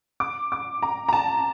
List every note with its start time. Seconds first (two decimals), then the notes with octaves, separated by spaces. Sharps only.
0.20 D6
0.52 D6
0.82 A#5
1.09 A#5
1.13 A5